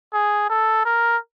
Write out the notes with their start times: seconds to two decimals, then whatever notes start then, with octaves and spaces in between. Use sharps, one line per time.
0.13 G#4
0.50 A4
0.85 A#4